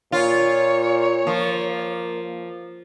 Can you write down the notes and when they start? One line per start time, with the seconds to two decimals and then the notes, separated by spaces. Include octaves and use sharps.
0.12 A#2 F4 C#5
1.27 F3 A#3